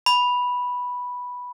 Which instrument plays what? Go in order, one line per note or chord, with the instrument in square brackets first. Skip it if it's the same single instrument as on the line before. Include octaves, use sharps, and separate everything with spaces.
[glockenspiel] B5